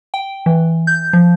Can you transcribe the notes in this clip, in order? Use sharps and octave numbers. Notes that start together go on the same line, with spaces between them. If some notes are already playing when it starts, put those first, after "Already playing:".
G5
E3
G6
F3